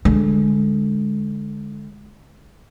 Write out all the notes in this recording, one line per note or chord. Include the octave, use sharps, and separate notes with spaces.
D3 G#3